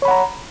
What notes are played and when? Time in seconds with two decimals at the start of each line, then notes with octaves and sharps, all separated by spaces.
0.02 C#5
0.05 B5
0.08 F#5
0.11 A#5